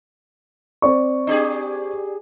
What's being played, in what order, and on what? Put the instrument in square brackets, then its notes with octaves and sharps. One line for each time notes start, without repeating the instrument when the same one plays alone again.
[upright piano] C4 D5 C#6
[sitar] D4 G4 G#4